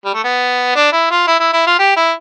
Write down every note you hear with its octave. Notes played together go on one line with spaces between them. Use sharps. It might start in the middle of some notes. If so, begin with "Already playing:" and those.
G3
A3
B3
D4
E4
F4
E4
E4
E4
F4
G4
E4